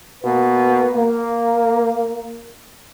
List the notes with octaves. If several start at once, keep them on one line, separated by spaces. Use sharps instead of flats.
B2 A#3 B4
A#3